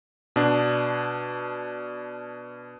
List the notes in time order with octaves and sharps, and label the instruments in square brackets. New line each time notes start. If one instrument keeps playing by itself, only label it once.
[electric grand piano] B2 D4